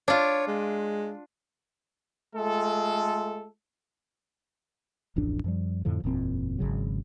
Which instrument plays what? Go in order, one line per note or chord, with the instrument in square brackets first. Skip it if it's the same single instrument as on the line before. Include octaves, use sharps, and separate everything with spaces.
[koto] D4 F4 [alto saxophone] C#5
[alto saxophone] G#3
[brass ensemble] G#3 A3 F4 A4
[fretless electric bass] D1 A1 F2 D4
F#2 F3 G3
F2 A2 D3 F3
F#1 E2 A#2 C4
G#1 C#3 F#3